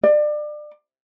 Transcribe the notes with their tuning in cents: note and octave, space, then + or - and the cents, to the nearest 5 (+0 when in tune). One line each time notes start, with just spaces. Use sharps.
D5 +30